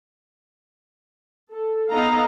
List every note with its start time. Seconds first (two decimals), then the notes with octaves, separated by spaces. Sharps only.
1.52 A4
1.91 B3 D#4 A4 D#5 F5 A#5